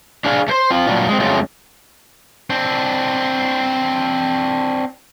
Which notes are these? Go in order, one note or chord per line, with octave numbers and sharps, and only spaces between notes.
D4 G#4 F5
A3 C5
C4 F4
A#2 C#3 F#3 G3 D4 F4
G#3 C4
F2 C#3 F#3 G#3 A3 F4
C4 D4